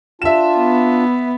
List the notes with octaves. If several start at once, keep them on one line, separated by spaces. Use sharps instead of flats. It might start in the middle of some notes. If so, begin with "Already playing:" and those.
D4 F4 E5 E7
B3